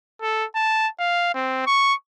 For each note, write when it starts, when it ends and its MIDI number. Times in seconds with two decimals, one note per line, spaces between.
0.22 0.45 69
0.55 0.88 81
0.99 1.32 77
1.35 1.66 60
1.66 1.94 85